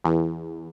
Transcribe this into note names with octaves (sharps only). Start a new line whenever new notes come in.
E2